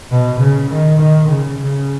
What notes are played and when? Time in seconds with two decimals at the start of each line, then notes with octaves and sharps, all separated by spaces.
0.11 B2
0.40 C#3
0.70 D#3
0.99 D#3
1.29 C#3
1.59 C#3